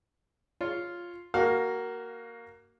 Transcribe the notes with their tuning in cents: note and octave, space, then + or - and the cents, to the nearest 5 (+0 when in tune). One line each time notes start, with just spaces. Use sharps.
F4 +0 C#5 +0
A#3 +0 F#4 +25 F5 +20